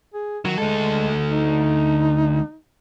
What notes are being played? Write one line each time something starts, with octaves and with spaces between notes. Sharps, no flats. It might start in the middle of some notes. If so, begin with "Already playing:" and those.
G#4
D#3 F#3
D2 G#3 A4
D#4